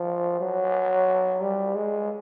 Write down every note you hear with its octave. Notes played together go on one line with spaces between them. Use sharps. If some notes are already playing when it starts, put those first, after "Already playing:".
Already playing: F3
F#3
G3
G#3